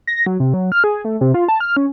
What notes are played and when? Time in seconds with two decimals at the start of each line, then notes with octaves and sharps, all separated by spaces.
0.07 A#6
0.26 F#3
0.40 C3
0.54 F#3
0.72 F6
0.84 G#4
1.05 A3
1.21 C3
1.34 F4
1.48 A5
1.60 F6
1.77 C#4